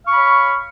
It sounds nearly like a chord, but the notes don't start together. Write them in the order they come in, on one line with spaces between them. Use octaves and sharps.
F5 C#6 B5 C#5